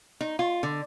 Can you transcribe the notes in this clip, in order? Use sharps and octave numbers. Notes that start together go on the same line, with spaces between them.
D#4
F4
D3